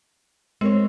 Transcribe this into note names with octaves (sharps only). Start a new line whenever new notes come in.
G#3 C4 A#4 C#5